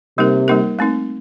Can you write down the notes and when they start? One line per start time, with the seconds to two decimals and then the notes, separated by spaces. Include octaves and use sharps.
0.18 C3 G3 A#3 D#4 A#4
0.48 G3 A#3 D#4 A#4
0.79 A3 C4 D#4